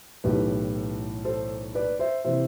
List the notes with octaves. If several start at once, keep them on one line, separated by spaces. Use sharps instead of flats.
B1 A2 E3 G4 B4
A4 C5
B4 D5
C5 E5
C3 E3 C5 E5